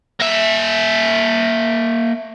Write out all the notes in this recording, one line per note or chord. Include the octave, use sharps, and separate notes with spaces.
A#3 E5